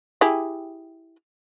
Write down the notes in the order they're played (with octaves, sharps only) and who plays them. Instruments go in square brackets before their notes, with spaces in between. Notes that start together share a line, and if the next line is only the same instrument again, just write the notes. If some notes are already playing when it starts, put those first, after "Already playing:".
[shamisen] E4 G4 G#4